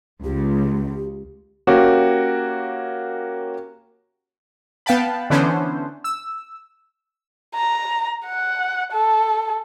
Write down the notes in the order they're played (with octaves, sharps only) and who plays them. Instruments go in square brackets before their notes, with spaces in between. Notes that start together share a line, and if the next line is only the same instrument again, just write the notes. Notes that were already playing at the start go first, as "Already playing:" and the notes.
[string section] C#2 [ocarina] G4
[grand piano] A#3 C#4 F#4 G4
[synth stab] B3 F5 G5 A5 B5
D3 E3 B3 C#4 D4 C5
E6
[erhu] A#5
F#5
A4